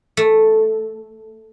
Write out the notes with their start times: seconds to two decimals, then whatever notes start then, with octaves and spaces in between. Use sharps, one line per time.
0.17 A3